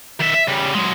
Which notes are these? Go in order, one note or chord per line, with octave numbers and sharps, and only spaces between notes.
D#3 E5
E5
C#3 G3
F#3 G#3